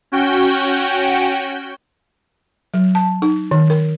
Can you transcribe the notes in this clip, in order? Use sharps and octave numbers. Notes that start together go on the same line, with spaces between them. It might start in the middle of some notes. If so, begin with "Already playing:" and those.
C#4 F#4 G5
F#3
A5
D#4
D#3
A#4